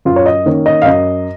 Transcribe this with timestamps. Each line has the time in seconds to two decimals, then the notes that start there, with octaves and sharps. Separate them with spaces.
0.05 F#2 F4
0.16 C#5
0.26 D#5
0.46 D#3 A#3 C#4
0.66 D#5
0.82 F5
0.85 F#2 D#5